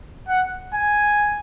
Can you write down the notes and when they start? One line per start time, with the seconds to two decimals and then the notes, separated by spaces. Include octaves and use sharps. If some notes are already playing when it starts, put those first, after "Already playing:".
0.28 F#5
0.74 G#5